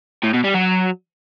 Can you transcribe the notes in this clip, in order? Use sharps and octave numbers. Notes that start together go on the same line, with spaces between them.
A2
B2
G3
F#3